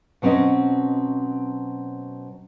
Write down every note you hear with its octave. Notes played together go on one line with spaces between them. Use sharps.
B2 F#3 C4 C#4 D#5